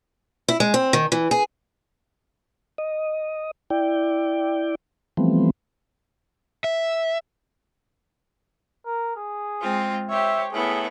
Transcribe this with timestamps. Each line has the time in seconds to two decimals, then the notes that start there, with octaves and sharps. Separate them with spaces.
0.48 E4
0.60 G#3
0.74 C4
0.93 D#3
1.12 E3
1.31 G#4
2.78 D#5
3.70 E4 D5 G5
5.17 E3 F3 G3 A3 B3 C4
6.64 E5
8.86 A#4
9.17 G#4
9.60 G#3 C4 F4
10.10 G4 C5 C#5 E5
10.52 A2 B3 E4 G#4